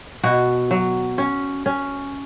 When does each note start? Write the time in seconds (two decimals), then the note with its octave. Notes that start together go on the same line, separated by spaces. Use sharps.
0.23 B2 F#4
0.71 F#3
1.18 C#4
1.66 C#4